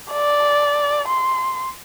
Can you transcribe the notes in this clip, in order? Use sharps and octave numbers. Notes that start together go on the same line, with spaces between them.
D5
C6